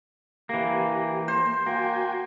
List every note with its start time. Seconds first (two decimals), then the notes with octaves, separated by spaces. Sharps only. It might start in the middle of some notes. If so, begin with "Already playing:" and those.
0.49 E3 A#3 G4
1.28 A#3 C5
1.66 A#3 F#4 G5 G#5